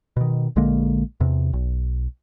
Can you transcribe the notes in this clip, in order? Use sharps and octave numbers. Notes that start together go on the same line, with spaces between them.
B2 D#3
A#1 D3 G#3 A#3
E2 C3
B1